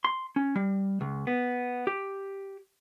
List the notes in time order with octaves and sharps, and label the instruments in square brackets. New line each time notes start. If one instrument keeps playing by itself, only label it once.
[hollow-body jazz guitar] C6
C#4
G3
C#2
B3
G4